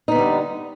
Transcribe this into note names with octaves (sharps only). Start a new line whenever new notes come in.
D3 G3 B3 D#4